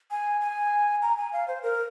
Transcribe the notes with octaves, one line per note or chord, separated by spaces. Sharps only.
G#5
G#5
A#5
G#5
F5
C5
A#4